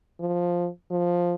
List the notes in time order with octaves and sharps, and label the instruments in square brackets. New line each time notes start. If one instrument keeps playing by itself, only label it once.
[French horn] F3
F3